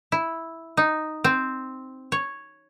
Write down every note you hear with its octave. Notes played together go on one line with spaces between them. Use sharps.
E4
D#4
C4
C#5